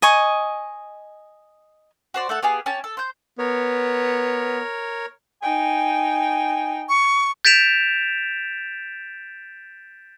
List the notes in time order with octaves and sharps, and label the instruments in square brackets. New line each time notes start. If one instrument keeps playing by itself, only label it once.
[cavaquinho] D#5 G#5 C#6
[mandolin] F#4 C5 D5
A3 A4 F#5
B3 G4 G#4 F5
C#4 G4 A5
A4
C5 G6
[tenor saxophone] B3 [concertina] A#4 C#5
[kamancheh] D#4 G5 [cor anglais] G#5
[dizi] C#6
[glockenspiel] G6 A6 B6 D7 E7 F7